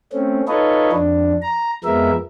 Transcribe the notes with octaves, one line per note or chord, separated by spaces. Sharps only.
A3 C4 C#4
D#4 F4 A4 B4 C#5 D#5
F2 D4
A#5
F2 F3 G#3 B3 A#4 E5